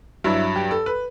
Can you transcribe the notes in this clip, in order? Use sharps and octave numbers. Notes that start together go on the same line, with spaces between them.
G2 F#3 E4
G4
A4
B4